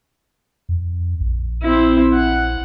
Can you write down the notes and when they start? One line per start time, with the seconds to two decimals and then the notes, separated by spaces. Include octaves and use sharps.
0.69 F2
1.20 A#1
1.62 C4 E4
2.13 F#5